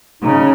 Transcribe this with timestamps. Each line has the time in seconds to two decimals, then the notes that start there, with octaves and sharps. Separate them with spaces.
0.22 C#3 D#4